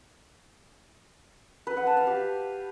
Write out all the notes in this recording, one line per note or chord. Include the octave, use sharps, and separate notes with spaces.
B4
F#5
A5
F5
G4